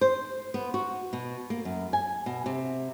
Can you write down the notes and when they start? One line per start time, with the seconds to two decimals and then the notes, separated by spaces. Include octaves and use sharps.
0.01 C5
0.54 B3
0.74 F#4
1.13 B2
1.50 A#3
1.65 F#2
1.93 G#5
2.26 B2
2.46 C3